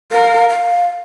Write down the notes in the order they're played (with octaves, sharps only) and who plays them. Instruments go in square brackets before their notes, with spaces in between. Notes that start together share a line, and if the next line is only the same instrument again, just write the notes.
[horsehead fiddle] A#4 [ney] F5
[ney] F5